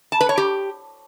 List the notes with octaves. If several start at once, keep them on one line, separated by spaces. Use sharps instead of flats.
A5
B4
C#5
G4